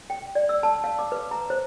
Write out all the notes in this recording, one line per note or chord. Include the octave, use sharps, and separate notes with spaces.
G5
D5
E6
A5
F5
D6
B4
A#5
C5